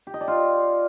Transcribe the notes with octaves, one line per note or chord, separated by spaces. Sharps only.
G4
D#5
D5
F4